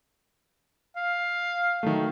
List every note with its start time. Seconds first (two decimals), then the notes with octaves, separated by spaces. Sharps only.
0.96 F5
1.83 D#3 F#3 A3